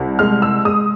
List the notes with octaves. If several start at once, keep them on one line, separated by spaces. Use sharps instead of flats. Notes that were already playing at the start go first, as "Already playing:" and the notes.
Already playing: C2
G#3 F6
E6
G#3 D#6